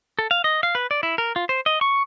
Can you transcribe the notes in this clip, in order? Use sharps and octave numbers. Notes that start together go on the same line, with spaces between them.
A4
F5
D#5
F5
B4
D5
E4
A#4
F4
C5
D#5
C#6